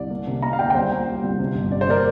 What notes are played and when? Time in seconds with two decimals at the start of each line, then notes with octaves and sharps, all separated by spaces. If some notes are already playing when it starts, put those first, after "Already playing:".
Already playing: C2 D5
0.11 A#3
0.27 C3
0.42 A#3 F5 A#5
0.53 F5
0.58 D2 D5 G5
0.70 G5
0.75 C2 C5 F5
0.91 A#2
1.07 G3
1.23 C2
1.39 C3
1.55 G1
1.71 C3 D5
1.81 C5
1.87 A#3 A#4 D5